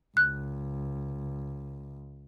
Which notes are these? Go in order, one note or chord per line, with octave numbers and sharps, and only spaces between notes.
C#2 F#6